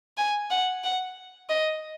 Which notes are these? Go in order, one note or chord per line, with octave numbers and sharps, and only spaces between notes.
G#5
F#5
F#5
D#5